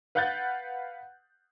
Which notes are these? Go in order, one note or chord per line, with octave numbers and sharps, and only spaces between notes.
B4 F5 F#5 F#6 G6 A6